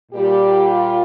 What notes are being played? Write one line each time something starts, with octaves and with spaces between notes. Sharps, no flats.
A#2 G3 G4
F4